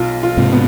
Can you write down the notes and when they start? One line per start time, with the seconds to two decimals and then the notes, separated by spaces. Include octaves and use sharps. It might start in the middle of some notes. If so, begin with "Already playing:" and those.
Already playing: B1 F4
0.23 F4
0.37 G#2 C3
0.53 B3